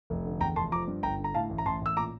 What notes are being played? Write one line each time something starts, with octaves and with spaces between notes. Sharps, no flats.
F1
D3
E2 G5 A#5
F1 A5 C6
F3 A#5 D6
G2
G1 G5 A#5
D3
A#5
A2 F5 A5
A1
A#5
A1 A5 C6
A1 E6
A#2 A#5 D6